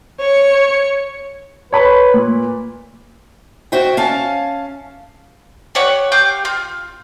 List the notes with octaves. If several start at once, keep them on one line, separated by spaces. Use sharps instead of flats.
C#5 C#7
B4 C#5 B5
A#2
F#4 C5 E5 G5
C#4 F5 A5
G4 C#5 F#5
G4 F5 G6
F4